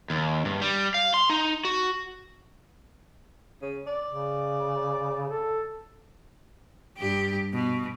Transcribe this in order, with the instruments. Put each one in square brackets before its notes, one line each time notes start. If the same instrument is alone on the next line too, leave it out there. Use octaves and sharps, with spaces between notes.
[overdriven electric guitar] D#2
G2
G3
F5
C6
D#4
F#4
[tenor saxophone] C#3
D5
[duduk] C#3
A4
[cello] G2 G4
B2